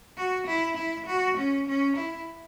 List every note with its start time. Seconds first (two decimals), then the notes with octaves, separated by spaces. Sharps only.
0.17 F#4
0.47 E4
0.77 E4
1.07 F#4
1.37 C#4
1.67 C#4
1.97 E4